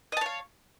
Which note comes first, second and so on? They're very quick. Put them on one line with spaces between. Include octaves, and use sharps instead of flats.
D#5 A5 C#5 F5